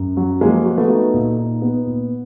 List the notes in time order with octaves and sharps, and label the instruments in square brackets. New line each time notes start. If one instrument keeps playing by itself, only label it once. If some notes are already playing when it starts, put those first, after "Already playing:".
Already playing: [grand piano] F#2
F#3
[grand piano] F3 [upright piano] G#3 A#3
[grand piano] F#4
[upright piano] A3 B3
[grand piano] D#4
A#2
D#4
B3
A#2